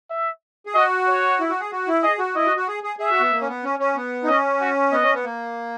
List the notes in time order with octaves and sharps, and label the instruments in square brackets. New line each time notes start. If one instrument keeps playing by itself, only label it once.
[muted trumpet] E5
[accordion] G#4
[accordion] F#4 [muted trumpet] D#5
[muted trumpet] C#5
[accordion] E4
F#4
G#4
F#4
E4
[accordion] G#4 [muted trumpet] D#5
[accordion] F#4
[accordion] E4 [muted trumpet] D#5
[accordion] F#4
F#4
G#4
G#4
[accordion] G#4 [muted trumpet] E5
[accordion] F#4
B3
A#3
C#4
B3
C#4
C#4
B3
D#4
[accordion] C#4 [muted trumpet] D#5
[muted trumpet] F#4
[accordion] B3 [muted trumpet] D#5
[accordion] C#4
B3
A#3